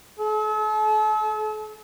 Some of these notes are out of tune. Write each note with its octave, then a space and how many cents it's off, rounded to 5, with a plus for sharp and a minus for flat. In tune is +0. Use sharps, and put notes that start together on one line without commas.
A4 -40